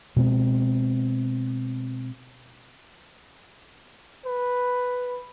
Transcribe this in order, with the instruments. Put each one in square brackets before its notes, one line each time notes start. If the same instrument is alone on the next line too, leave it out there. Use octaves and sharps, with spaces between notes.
[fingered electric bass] B2 G#3 A#3 C4
[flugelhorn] B4